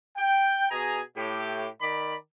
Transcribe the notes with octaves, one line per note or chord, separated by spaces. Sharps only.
G5
B2 G#4 A#5
A2 G4
D#3 D5 B5